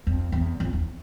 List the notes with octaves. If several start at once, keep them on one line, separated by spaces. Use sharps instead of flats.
F2
E2
F2
E2